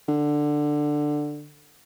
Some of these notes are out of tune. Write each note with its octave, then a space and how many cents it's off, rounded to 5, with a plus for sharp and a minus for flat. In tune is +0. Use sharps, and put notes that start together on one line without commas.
D3 +10